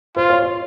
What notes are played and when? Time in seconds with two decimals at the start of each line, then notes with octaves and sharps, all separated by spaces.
0.16 F4 C5
0.30 C#5
0.42 C#5